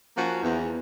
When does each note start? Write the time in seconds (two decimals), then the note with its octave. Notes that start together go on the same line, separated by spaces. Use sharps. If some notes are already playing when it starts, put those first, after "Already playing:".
0.16 F3 A#3 C#4 F#4
0.42 E2